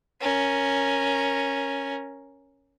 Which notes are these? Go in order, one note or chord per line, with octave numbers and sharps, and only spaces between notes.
C#4 A#4